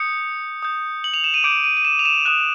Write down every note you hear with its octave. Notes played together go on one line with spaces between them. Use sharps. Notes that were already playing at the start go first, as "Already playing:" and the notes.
Already playing: D#6 G6 C#7
D#6 G6
F#7
F7
E7
D#7
D6 G6 D7
D#7
D#7
E7
F7
E7
D#6 F#6 E7